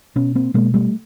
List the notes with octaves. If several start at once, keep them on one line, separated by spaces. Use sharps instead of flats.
B2 B3 C#4
A#3 C4
B2 G#3 A#3
G3 A3